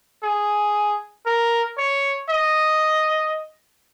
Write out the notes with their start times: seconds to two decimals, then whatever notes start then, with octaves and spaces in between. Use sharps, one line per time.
0.23 G#4
1.26 A#4
1.77 C#5
2.29 D#5